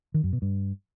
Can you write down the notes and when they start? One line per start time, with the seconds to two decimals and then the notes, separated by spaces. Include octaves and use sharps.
0.14 D#3
0.24 F#2
0.33 B2
0.42 G2